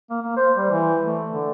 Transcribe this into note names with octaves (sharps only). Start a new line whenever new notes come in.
A#3
A#3
C5
G3
E3
A3
D3